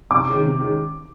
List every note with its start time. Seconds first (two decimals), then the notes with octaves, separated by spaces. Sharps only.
0.10 C3 D6
0.27 D#3 G#3 C#4
0.43 C3
0.60 D#3 G#3 C#4